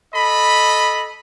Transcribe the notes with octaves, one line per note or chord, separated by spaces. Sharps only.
A4 D#5 B5